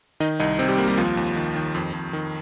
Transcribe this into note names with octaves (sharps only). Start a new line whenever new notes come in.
D#3 D#4 D#5
C2 D#4 D#5
C3 C4 C5
G3 G4
C2 A#3 A#4
G3 G4
D#2 F3 F4
D#2
D#3
D#3
F2
F2
D#3